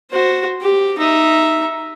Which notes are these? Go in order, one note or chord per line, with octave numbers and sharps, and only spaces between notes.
F#4 C5
G4
D#4 E5